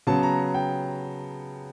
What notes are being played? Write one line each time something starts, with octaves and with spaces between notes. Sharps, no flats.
C#3 F#3 B3 A5
A#5
G5